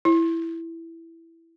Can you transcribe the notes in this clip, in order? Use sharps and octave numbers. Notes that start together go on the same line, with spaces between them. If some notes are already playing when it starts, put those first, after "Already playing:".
E4